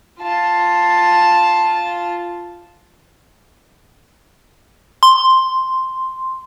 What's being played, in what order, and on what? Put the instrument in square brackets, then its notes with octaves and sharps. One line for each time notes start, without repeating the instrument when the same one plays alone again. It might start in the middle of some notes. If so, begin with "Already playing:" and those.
[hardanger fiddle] F4 A5
[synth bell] C6